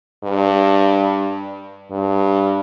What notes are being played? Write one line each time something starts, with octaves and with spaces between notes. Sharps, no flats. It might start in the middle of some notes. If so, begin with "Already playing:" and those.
G2
G2